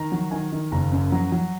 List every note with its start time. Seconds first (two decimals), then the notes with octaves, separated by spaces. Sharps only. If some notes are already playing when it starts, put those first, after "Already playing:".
Already playing: D#3 A#5
0.12 F#3
0.31 D#3 G#5
0.52 D#3
0.72 F#1 A#5
0.92 F#2
1.12 F#3 A#5
1.32 F#3